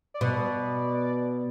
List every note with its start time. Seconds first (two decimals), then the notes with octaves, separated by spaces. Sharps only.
0.14 D5
0.21 B2